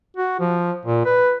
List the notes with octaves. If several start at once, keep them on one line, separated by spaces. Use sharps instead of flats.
F#4
F3
A#2
B4